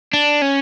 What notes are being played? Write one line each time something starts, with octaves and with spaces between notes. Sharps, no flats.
D4
C#4